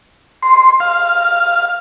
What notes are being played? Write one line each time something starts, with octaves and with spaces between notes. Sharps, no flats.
C6
F5